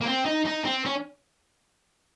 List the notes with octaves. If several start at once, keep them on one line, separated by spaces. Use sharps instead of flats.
A#3
C4
D#4
D#4
C4
C#4